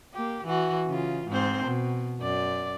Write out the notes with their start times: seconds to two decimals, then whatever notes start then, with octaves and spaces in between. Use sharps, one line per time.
0.14 A#3 G4
0.45 E3 F#4
0.86 C#3 F4
1.28 G#2 C4 C5
1.65 B2
2.20 F#2 D5